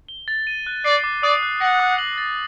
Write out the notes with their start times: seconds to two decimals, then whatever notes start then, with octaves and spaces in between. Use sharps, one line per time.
0.08 G7
0.28 A6
0.47 D#7
0.66 F#6
0.85 D5 C7
1.04 D6
1.23 D5 D#6
1.42 F#6
1.61 F#5 A#6
1.80 D#6
1.99 F#7
2.18 A6